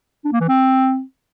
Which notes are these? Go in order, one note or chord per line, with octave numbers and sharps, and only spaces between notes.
D4
A#3
E3
C4